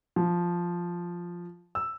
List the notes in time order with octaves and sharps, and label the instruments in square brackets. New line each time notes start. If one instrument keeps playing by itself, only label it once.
[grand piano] F3
E6